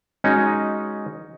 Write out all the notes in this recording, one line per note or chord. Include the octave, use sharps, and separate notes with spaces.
G#3 C#4 D#4 F#4